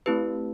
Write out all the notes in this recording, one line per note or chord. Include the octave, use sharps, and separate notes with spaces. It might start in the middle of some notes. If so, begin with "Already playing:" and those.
A3 C4 E4 G4 B4